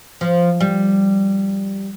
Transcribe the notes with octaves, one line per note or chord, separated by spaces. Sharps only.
F3
G3